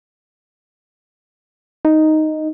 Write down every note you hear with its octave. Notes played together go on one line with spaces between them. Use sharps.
D#4